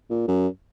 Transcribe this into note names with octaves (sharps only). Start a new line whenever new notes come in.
A#2
F#2